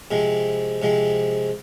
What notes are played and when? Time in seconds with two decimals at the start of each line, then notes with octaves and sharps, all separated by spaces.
0.11 C3 F3 G#3
0.82 C3 F3 G#3